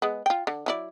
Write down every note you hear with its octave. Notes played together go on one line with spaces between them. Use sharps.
G#3 B3
F4 G5
D3
F#3 E4 D5